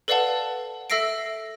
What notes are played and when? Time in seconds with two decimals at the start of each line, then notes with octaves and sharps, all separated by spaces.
0.08 A4 B4 D5 F5 F#5 A5
0.90 A4 E5 E6 A#6 C7 D7